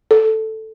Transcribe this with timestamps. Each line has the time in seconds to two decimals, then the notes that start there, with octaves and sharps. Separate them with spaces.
0.11 A4